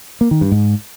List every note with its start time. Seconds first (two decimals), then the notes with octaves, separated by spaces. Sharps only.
0.21 A#3
0.31 D#3
0.41 G2
0.52 G#2